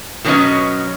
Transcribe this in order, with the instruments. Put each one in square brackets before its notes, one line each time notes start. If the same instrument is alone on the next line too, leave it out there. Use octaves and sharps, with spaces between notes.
[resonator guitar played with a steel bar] B2 D#3 F#3 B3 C#4 D#5